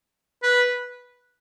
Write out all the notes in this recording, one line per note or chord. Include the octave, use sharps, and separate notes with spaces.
B4